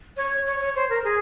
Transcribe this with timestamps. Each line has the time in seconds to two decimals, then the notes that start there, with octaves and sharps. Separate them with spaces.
0.17 C#5
0.46 C#5
0.60 C#5
0.75 C5
0.90 A#4
1.04 G#4